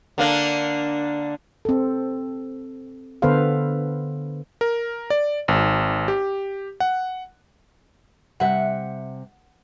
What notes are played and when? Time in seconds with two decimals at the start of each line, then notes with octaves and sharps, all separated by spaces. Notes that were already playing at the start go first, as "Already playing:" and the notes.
0.18 D3 A#3 D4
1.65 C4 A4
3.22 D3 B3 A4 B4 C5 F5
4.61 A#4
5.10 D5
5.48 G#1
6.08 G4
6.80 F#5
8.40 C3 G3 E5 F#5